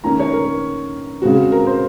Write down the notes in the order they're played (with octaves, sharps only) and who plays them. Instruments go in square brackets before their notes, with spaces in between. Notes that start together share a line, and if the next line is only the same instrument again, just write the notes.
[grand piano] D#3 A#3 C#4 A#5
C#5
A#4
C#3 G#3 C4 F#4
A#4
C5